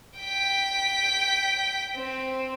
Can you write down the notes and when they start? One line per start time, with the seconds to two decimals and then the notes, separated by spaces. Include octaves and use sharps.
0.18 G5 B6
1.95 C4